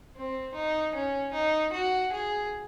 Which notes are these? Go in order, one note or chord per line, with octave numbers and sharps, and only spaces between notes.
C4
D#4
C#4
D#4
F#4
G#4